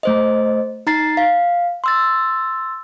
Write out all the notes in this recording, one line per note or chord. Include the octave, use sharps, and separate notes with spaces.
A3 C5 D#5
D#4 A#5 A6 C7
F5
C6 E6 A6